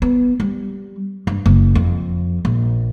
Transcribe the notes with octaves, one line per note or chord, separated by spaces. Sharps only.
B3
G3
G2
F#1
F2
A#1